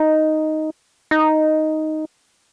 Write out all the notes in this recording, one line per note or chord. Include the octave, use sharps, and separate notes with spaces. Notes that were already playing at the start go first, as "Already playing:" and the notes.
Already playing: D#4
D#4